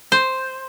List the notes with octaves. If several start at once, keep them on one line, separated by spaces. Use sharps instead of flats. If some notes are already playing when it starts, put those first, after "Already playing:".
C5